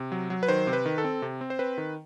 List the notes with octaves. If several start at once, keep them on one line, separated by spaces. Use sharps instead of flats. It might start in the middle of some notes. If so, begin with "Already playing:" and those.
Already playing: C3
F#3
F#3
B4
D#3 C5
C3
B4
D#3
A4
C4
C3
C4
C5
C4 B4
D#3